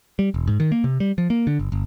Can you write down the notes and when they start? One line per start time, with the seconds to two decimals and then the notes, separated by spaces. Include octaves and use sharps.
0.19 G3
0.34 E1
0.48 G#2
0.60 D#3
0.72 A#3
0.84 C3
1.00 G3
1.18 F3
1.30 A#3
1.47 D3
1.59 G1
1.72 G1